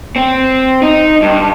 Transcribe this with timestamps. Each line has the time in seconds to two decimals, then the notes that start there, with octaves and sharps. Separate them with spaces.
0.16 C4
0.83 D#4
1.22 G2